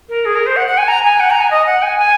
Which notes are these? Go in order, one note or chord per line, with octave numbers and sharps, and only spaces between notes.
A#4
G#4
A#4
C5
F#5
F#5
G#5
A#5
G#5
F#5
A#5
G#5
D#5
F#5
G#5
G#5